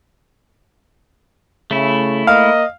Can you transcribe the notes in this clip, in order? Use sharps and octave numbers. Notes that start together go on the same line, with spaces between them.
C#3 A3 E4
A#3 D#5 F5